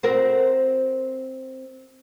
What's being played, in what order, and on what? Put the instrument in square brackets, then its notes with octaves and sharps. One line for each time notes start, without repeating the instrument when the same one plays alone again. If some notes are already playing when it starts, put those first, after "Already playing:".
[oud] C4 F#4 A#4